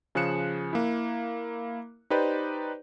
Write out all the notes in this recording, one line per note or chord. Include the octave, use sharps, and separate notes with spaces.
C#3 F3 G#4 F#6 C#7 E7
A#3 E4
D#4 G4 B4 C5 D5